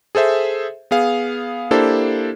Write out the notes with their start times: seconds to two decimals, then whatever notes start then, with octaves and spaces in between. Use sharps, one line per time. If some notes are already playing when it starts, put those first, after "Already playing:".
0.15 G#4 A4 C5 E5
0.91 B3 G#4 F5
1.71 A#3 D4 E4 G4 A4 C5